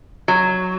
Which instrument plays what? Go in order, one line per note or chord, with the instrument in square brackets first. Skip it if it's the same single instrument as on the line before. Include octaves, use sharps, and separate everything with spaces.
[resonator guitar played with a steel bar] F#3